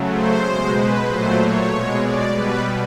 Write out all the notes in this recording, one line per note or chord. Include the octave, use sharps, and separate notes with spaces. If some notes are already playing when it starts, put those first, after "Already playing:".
Already playing: C#3 F#3 A3
C5
B2 G#3
B4
A#2 F#3 A3 C5
C#5
B2 G#3
D5
B2 G3 B4